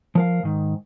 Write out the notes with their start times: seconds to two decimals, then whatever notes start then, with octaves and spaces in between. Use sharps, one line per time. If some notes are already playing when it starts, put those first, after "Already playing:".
0.15 F3 A#4 F5
0.43 G#2 D#3